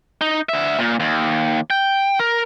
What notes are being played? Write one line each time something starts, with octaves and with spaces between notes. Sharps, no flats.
D#4
D3 E5
A#2
D#2
G5
A#4